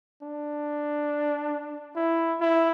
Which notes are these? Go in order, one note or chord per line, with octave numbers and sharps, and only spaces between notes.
D4
E4
E4